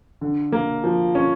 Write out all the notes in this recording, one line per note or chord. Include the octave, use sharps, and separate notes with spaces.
D3
A#3
F3
C#4